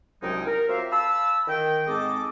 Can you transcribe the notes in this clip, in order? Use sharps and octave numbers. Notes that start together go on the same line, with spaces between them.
C2 F#2 F#3 G#3 D#4 G5
A#4
F#3 C4 F4 G4 E5 F5
F5 A5 B5 E6
D#3 G5
G#2 G#3 C4 A4 D#5 D6